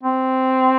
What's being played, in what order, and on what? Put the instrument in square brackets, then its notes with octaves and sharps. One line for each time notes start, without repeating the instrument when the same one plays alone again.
[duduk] C4